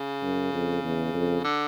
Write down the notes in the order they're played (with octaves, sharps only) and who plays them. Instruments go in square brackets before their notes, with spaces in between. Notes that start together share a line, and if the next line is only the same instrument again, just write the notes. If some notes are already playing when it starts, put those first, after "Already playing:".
Already playing: [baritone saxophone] C#3
[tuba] F#2
F2
E2
F2
[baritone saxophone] D3